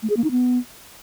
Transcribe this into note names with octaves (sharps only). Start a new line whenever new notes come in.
A3
G#4
A#3
D#4
B3